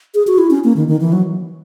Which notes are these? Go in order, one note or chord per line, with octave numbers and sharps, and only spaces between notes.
G#4
F#4
E4
C#4
A#3
D#3
D#3
E3
F#3